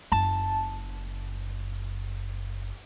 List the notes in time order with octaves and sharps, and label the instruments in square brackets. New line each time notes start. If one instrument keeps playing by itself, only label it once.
[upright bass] F#1 [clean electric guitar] A5